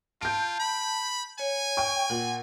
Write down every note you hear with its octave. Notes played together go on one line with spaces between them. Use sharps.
F4 A5 G6 D7
B5
C#5 G#5
G5 C#6
A#2 F#5